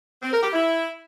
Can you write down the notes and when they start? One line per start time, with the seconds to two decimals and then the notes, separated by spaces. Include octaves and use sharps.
0.22 C4
0.33 A#4
0.43 G4
0.53 E4